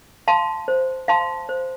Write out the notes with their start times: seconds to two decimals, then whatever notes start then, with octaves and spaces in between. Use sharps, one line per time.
0.28 F5 A5 C6
0.68 C5
1.08 F5 A5 C6
1.49 C5